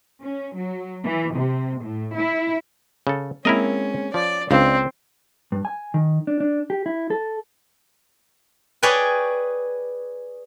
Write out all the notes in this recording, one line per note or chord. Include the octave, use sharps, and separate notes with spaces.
C#4
F#3
E3
C3
A2
E4
C#3 A4
G#3 A#3 C4 C#4 E4 A#4 D#5
F3 D5
C#2 C4 D4 D5 F5
G2
G#5
D#3
D4
D4
G4
E4
A4
G#4 B4 C#5 D5 G5 G#5